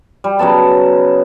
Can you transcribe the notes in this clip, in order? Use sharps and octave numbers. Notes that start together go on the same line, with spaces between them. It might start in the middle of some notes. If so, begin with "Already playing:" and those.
G3
C#3 F#3 B3 A5